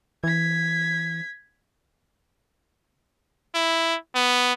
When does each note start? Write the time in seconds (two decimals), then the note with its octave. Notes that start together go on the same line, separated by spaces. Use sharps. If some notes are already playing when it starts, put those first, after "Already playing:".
0.24 E3 G#6 B6
3.55 E4
4.15 B3